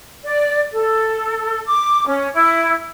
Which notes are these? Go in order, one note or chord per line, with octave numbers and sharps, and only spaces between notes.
D5
A4
D6
C#4
E4